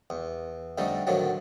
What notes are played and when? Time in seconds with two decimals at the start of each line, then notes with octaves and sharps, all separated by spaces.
0.10 E2
0.78 F2 D3 G3 A3 D#4
1.07 A2 D3 D#3 F3 F#3